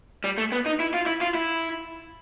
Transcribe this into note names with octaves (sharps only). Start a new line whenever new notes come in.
G3
A3
B3
D#4
E4
F4
E4
F4
E4